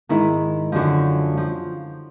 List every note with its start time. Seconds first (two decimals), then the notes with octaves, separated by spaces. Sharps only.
0.09 G#2 D#3 E4
0.72 F#2 D3 F3
1.37 F3